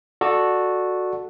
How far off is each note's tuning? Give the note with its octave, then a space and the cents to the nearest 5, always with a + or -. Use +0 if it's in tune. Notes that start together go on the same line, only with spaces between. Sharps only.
F#4 -10 A4 +0 D5 +15